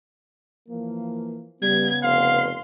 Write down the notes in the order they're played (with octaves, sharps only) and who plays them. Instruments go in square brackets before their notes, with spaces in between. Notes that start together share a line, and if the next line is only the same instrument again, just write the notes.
[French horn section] E3 F3 A#3
[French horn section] C#3 B3 [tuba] G3 [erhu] G#6
[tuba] F1 [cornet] F5 [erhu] C6